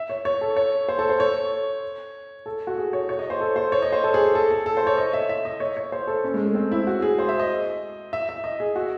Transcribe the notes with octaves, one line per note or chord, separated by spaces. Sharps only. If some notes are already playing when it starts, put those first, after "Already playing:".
Already playing: E5
C#5
C#5
A4
C#5
C5
A4
C5
C#5
A4
F#4
G#4
C#5
C#5
D#5
C5
A4
C5
C#5
D#5
C5
A4
G#4
G#4
A4
A4
A4
C5
C#5
D#5
E5
E5
D#5
C#5
C#5
C5
A4
C#4
G#3
A3
C4
E4
F#4
G#4
C5
E5
D#5
E5
E5
D#5
G#4
F#4